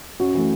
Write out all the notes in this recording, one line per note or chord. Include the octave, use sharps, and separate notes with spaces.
F#2 F#4
E3 A3